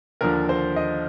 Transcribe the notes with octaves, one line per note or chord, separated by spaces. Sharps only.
D#2 D3 F3 A#4
C5
D#5